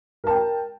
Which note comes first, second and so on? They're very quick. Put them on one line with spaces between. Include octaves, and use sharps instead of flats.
A#4 A5 G5